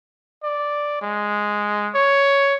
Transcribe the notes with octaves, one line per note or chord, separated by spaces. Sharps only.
D5
G#3
C#5